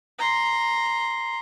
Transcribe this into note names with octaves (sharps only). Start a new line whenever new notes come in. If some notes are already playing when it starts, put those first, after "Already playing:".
A#5 C6